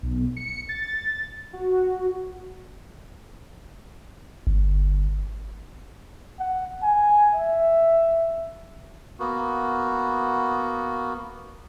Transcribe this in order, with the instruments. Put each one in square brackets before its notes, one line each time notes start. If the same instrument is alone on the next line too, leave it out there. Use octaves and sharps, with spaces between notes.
[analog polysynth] B1
C#7
A6
F#4
[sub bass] G1
[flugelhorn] F#5
G#5
E5
[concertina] A#3 B3 F#4